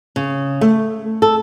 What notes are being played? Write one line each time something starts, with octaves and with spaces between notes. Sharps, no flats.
C#3
A3
A4